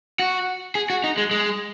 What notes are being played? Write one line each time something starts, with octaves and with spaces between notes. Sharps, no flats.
F#4
G#4
F#4
D#4
G#3
G#3